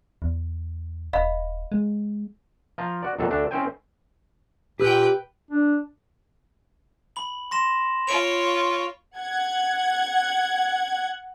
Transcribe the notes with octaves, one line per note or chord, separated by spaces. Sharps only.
E2
D#1 D#5 F5 B5
G#3
F3 F4 A#5
F#4 D5
F2 A#2 F#3 A4
D2 A3 D4 E5 A5
C4 C#4 E4 C5 G5 G#5
A#2 G4 B4 G5 E6 G6
D4
B5 F#7
C6 A#6 E7
F4 C#5 C#6 D7 F7
F#5 G#6